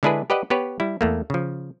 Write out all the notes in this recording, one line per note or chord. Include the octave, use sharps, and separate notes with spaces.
D3 G#3 D4 E4 G#4 B4
G4 B4 D5 D#5 F#5
B3 G4 B4 C#5
G3 E4
E2 A3 A#3
C#3 F3